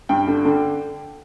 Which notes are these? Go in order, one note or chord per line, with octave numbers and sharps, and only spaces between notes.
G2 G5
D3
D3